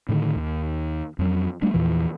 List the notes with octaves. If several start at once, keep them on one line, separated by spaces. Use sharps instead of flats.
A2 D3 D#3
D#2
F2 F#3
G3 A3 A#3 D4
E2 A#2 E3 F3